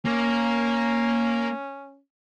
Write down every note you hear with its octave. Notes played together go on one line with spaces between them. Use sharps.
A#3 C#4